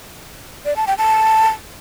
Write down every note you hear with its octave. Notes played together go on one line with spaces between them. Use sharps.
D5
A5
G5
A5